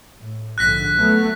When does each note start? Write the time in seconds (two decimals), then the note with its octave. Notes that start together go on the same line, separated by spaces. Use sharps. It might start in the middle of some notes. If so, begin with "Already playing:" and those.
0.20 A2
0.58 A#1 G#2 D3 F#6 A#6 B6
0.96 F#3 A3 B3